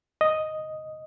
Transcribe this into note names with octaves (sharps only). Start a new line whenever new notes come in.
D#5